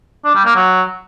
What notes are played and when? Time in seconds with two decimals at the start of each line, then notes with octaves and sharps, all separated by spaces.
0.25 D4
0.35 G3
0.45 A#3
0.55 F#3